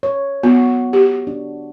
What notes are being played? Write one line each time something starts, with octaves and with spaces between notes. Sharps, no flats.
C#5
B3 F#4
G4
D4